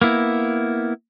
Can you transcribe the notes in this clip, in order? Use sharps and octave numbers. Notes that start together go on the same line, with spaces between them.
A#3 B3 E4